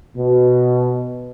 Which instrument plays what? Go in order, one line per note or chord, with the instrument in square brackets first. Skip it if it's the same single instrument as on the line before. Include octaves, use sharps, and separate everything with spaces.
[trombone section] B2